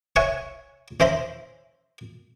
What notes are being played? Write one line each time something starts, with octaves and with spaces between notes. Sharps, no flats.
C#5 E5 F#5 G#5 C#6
C#4 C5 E5 A#5 B5